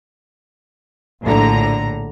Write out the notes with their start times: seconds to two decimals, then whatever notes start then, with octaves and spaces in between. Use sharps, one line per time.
1.23 A#1 A2 D3 A#5